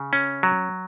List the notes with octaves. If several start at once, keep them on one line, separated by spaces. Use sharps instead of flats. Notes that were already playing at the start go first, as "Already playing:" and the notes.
Already playing: C#3
C#4
F#3